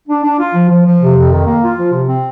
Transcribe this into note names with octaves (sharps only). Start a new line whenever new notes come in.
D4
D4
F4
F3
F3
F3
C3
F2
D#3
A#3
F4
F3
C3
C4